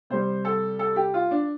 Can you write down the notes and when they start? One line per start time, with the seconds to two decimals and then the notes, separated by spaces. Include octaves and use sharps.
0.10 C3 G3 C5
0.45 A4
0.79 A4
0.96 G4
1.14 F4
1.31 D4